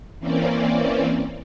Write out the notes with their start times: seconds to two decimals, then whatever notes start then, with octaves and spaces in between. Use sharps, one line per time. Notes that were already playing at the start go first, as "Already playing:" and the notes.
0.20 E3 A#3 C4 C#4 D5